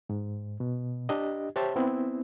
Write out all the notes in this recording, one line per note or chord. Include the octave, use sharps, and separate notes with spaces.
G#2
B2
D4 G4 D#5
G4 C5 C#5 E5 A5
B3 C4 E4